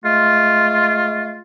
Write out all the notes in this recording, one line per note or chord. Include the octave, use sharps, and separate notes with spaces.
G#3 A3 F4